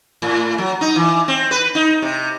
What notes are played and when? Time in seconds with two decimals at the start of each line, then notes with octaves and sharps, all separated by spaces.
0.22 A2
0.58 F#3
0.81 D#4
0.96 E3
1.28 C4
1.51 B4
1.75 D#4
2.02 C3